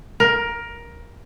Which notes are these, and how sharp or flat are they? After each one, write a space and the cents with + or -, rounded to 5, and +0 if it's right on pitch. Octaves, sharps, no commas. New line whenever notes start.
A#4 +15